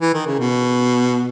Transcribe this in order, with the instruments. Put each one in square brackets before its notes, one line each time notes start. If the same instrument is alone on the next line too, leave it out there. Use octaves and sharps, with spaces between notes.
[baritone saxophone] E3
D#3
C#3
B2